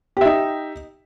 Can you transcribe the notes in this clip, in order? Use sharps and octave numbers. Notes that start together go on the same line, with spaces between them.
D#4 G4 E5